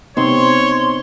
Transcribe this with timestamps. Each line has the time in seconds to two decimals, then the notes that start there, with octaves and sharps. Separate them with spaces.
0.17 C3 B3 C4 D#4 C#5 C6